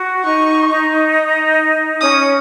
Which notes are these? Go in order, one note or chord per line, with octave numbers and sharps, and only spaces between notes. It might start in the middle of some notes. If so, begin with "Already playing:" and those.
Already playing: F#4
D#4 C#6
D#4
C#4 D#6